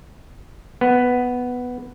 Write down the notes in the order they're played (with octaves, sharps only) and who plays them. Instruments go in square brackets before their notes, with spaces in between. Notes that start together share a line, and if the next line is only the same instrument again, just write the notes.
[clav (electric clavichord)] B3